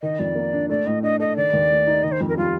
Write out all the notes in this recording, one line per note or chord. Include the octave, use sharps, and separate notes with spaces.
D#3 D#5
F2 D5
A#3
D4
A3 D5
A2 D#5
D4 D#5
A4 D#5
D#3 D5
D#2
A3
D#4
D#3 D#5
C5
F2
A#4
G3 F4